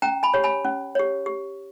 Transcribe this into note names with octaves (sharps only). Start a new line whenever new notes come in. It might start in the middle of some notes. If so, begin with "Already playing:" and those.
C#4 G5 A#5
G#5 B5
G4 C#5
G#5 B5
C#4
G4 C#5
G4